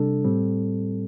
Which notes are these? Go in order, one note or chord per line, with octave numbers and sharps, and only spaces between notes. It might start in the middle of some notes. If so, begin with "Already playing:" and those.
Already playing: C3 G3 D4 A4
A2 G3 C4